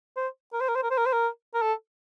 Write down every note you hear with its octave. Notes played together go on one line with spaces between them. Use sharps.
C5
A#4
C5
A#4
C5
A#4
C5
A#4
C5
A#4
A#4
A4